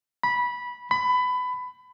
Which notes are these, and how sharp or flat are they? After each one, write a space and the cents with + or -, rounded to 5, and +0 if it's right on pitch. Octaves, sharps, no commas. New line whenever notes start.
B5 -15
B5 +20